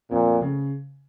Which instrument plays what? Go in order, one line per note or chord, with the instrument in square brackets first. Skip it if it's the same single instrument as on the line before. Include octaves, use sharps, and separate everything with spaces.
[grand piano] F2 [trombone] A#2
[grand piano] A3
C#3